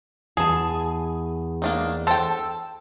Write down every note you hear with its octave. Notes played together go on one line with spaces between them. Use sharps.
E2 G#4 A5
A#3 D4 D#4
A4 C5 G5